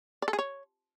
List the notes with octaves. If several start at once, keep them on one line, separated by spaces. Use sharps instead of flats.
D5
A4
G#4
C#5